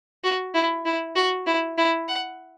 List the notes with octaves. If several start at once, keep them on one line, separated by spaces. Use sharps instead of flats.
F#4
E4
E4
F#4
E4
E4
F#5